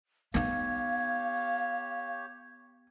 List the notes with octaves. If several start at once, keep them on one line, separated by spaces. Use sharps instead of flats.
B3 D#4 G4 C#5 F5